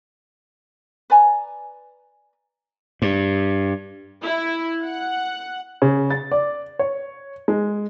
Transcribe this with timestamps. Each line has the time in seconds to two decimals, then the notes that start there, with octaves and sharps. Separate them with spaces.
1.10 B4 D5 G#5 A#5
3.02 G2
4.22 E4
4.83 F#5
5.82 C#3
6.11 A6
6.31 D5
6.79 C#5
7.48 G#3